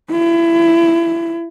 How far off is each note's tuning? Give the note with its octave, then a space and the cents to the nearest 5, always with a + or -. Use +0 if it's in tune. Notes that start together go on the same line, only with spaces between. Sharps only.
E4 +25